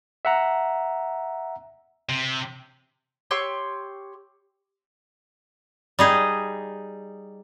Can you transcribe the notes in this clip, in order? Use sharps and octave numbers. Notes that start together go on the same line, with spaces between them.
E5 F#5 A#5
C3
G4 C#5 C6 E6
G3 D#4 G#4